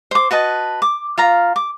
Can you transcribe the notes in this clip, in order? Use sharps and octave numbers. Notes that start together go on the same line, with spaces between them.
C5 D6
F#4 B4 D#5 A5
D6
F4 F5 A#5
D6